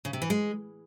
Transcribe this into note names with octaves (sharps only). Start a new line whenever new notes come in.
C#3
C3
E3
G#3